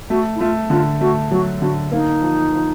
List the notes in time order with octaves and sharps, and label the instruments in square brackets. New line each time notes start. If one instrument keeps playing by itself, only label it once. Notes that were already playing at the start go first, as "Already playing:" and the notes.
[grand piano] A3 [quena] F#4
[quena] E4
[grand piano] A3 [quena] F4
[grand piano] D3 [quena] F4
[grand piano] A3 [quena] F#4
[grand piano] F#3 [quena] F#4
[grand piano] D3 [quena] F#4
[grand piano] A#3 [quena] D#4
[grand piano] F3
F3